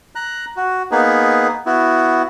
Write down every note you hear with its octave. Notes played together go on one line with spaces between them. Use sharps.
A#5 F#6
F#4
A#3 B3 D#4 G#4 B4
B3 E4 F#4